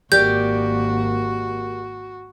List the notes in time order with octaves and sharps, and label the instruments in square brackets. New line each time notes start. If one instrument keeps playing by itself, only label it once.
[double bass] G#1 A#3 [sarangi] F#4 [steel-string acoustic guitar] G4 A#4 D5 [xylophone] G6